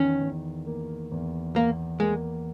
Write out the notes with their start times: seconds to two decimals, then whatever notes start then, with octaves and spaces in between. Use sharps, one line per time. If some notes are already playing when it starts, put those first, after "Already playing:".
Already playing: E2 D#3 C#4
0.22 E2
0.66 A#3
1.12 E2
1.56 E2 A#3
2.00 G#3 A#3